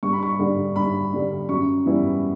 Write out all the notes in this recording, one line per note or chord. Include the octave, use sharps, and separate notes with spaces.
G2 C#6
B5
C#6
D3 G3 D4
G2 B5
D3 G3 D4
F#2 C#6
E3 G3 B3 E4